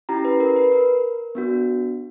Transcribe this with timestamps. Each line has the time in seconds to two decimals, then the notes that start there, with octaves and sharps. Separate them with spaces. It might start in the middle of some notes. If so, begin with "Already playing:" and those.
0.09 C#4 E4 G4 A#5
0.25 B4
0.40 A#4
0.56 B4
0.72 A#4
1.35 B3 D4 F#4